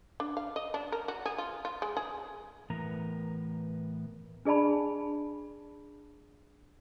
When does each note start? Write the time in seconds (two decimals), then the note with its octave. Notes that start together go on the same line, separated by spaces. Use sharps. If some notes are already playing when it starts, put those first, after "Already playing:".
0.20 D4
0.37 F5
0.56 D#5
0.74 D4
0.92 A#4
1.08 F#4
1.26 G#4
1.38 F4
1.65 F4
1.82 G#3
1.97 G#4
2.70 A2 E3 B3 A#4 A#5
4.45 D4 G#4 D5 A5 B5